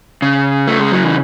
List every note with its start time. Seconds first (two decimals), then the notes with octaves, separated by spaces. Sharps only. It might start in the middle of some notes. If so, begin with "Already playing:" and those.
0.22 C#3
0.68 A3
0.79 G#3
0.92 F#3
1.04 E3